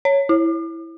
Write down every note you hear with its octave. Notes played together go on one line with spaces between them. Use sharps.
C#5
E4